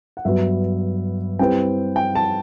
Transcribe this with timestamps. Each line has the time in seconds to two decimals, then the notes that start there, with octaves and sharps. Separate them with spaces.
0.17 F#5
0.25 G2 F#3 B3 F#4 B4 E5
1.39 G3 C4 E4 G4 B4 G5
1.96 G5
2.15 A5